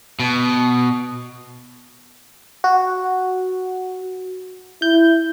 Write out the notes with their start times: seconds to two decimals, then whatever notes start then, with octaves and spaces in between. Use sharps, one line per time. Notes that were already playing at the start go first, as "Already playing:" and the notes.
0.20 B2
2.64 F#4
4.82 E4 G6